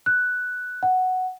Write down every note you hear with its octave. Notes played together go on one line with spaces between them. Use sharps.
F#6
F#5